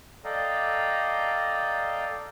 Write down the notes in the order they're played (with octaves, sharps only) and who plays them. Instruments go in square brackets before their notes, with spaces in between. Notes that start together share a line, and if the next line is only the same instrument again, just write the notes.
[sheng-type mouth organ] A4 D5 D#5 F5 G5 A#5